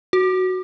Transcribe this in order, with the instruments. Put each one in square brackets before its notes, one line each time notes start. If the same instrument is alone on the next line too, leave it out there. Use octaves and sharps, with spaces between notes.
[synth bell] F#4